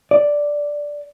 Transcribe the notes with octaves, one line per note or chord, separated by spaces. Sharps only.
D5